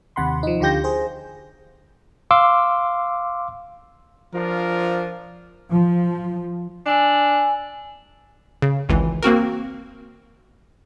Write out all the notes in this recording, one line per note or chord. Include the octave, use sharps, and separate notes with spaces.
D#2 C3 F#5 B5 C6
F3 D#4
D2 D3 F4 G4 G6 A#6
G#4 C5
F5 C6 D6 E6
F3 D4 F4 A#4
F3
D4 G#5 E6
C#3
G#1 C#2 E3
A#3 C4 F#4 A#4